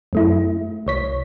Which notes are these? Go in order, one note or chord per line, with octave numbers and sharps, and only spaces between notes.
F#2 A3 E4
C2 C#5 B6